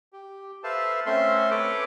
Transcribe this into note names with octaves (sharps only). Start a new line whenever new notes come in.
G4
A4 B4 C5 E5 F5 A5
A3 C4 C#4 A4 E5 C6
A4 B4 C#5 D6